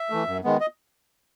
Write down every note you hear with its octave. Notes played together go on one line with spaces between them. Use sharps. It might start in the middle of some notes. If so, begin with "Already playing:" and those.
Already playing: E5
E3 A3
F#2
D#3 G#3 B3
D#5